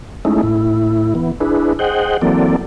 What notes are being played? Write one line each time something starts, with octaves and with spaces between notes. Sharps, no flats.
G#3 A3 C#4 D#4 E4
A2 E4
E3 B3
D4 E4 G#4 B4
G#4 C5 D#5 F#5 G5
E3 F#3 A#3 C4 A4 D5